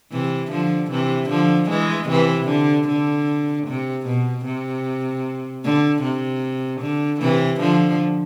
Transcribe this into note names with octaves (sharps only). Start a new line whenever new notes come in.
C3 E3
D3 F3
C3 E3
D3 F3
E3 G#3
C3 E3
D3
D3
C3
B2
C3
D3
C3
D3
C3 E3
D3 F3